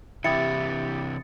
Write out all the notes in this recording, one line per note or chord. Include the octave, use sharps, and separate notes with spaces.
C3 E3 E4 G4 D#6 A6 C#7